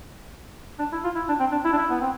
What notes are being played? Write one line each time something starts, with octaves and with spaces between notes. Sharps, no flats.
D4
E4
F4
E4
D4
C4
D4
E4
D4
E4
B3
C4